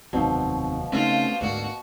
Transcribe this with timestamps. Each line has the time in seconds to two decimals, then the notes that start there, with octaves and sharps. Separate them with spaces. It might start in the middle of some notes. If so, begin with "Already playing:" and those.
0.13 F1 D#2 B2 F3 F#3 C4 D#4
0.92 C#3 A3 C4 C#4 D#4 F4 C5
1.41 D2 G#2 A#3 F#4 D5